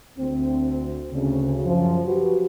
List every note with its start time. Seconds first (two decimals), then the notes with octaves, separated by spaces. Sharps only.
0.19 D2 C4
1.13 D2 C#3
1.64 F#2 F3 F4
2.05 F#4 G4 B4